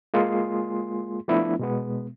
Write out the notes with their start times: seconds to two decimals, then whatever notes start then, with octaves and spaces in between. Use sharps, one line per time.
0.14 G#3 A#3 F4 G#4 C6
1.28 F3 A3 B3 D4 E4
1.59 B2 G#3 B3